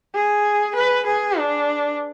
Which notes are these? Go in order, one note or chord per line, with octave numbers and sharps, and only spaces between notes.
G#4
B4
G#4
D4